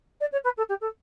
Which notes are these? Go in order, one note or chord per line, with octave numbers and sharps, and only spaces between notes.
D5
C#5
B4
A4
G4
A4